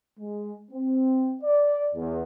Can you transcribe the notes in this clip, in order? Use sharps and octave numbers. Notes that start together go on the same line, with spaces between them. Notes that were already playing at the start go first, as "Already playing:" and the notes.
G#3
C4
D5
E2